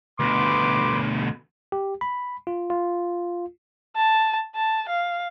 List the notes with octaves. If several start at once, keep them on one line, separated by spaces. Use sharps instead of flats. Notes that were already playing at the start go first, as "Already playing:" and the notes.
D2 B2 B4 C6 D6
G4
B5
F4
F4
A5
A5
F5